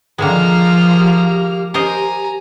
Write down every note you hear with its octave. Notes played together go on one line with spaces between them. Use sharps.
D3 D#3 F3 G#3 A#3 A#5 F6
G4
A#4 C5 D#5 G#5 A#5